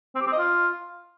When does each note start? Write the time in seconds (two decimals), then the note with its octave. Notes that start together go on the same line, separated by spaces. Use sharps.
0.15 C4
0.21 G4
0.27 C4
0.33 D#5
0.38 F4